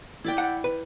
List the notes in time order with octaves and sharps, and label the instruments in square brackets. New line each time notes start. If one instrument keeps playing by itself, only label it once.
[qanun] E4 D5 G5
[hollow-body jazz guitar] F#5
B4